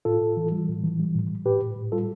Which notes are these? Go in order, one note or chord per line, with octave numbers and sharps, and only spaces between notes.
A2 F4 A4
A2
E3
G3
A2
E3
G3
A2
A2
A2 G4 B4
A2
A2
G3 F4 A4